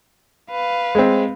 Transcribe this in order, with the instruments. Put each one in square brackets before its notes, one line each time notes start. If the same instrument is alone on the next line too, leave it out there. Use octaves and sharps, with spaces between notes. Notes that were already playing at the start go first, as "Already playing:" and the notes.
[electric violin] B4 F5
[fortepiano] G#3 C4